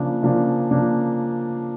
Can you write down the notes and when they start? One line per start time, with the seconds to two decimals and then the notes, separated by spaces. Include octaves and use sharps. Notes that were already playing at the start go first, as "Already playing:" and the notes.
Already playing: C#3 F3 A#3 D4
0.23 C#3 F3 A#3 D4
0.71 C#3 F3 A#3 D4